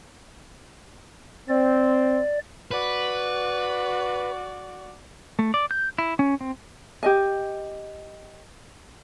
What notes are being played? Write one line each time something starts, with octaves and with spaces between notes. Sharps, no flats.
C4 D5
F#4 B4 D5
A3
D5
G6
E4
C#4
C4
G4 D#5 G#5